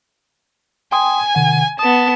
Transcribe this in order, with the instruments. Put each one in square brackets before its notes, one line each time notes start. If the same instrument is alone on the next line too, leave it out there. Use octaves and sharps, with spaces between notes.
[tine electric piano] G5 C6 D#6 [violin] G#5
[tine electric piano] C3 D#3 F#5
[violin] B3 A5 [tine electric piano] D#6